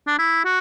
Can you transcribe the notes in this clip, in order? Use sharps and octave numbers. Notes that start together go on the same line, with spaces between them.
D4
E4
F#4